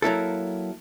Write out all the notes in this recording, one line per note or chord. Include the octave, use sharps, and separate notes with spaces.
F#3 A#3 E4 A4